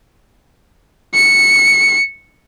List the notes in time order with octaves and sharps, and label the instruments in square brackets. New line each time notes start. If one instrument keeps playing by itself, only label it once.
[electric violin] C#7